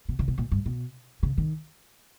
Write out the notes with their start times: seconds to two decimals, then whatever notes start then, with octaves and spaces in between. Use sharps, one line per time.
0.09 B2
0.19 C#3
0.28 B2
0.38 A#2
0.52 G2
0.66 B2
1.23 C#3
1.38 D#3